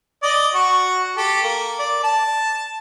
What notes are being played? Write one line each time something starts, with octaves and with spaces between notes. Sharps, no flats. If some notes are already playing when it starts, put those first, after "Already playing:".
D5 D#5
F#4 C#6
G4 A4
A#3
D5
A5